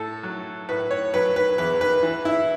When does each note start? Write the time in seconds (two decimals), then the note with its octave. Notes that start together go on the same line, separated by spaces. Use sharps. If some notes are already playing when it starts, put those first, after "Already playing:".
Already playing: A2 A4
0.23 F#3
0.69 A2 B4
0.91 C#5
1.14 F#3 B4
1.36 B4
1.58 E2 B4
1.81 B4
2.03 E3
2.25 E4